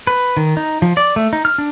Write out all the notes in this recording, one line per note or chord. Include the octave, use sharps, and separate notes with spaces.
B4
D#3
D#4
F3
D5
A3
D#4
F6
D4